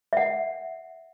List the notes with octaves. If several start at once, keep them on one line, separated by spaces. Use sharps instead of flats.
E5 F#5